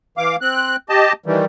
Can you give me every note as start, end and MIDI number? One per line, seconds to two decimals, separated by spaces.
0.18 0.36 52
0.18 0.36 77
0.18 0.36 86
0.41 0.76 60
0.41 0.76 90
0.89 1.13 67
0.89 1.13 75
0.89 1.13 81
1.26 1.45 51
1.26 1.45 52
1.26 1.45 55